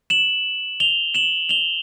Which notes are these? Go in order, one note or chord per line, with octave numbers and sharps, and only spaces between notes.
E7 F#7
F7 G7
E7 F#7
F7 G7